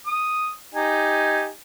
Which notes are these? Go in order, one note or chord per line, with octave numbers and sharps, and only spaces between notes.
D#6
D#4 G4 G#5